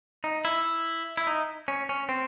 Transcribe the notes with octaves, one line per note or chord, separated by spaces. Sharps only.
D#4
E4
E4
D#4
C#4
C#4
C4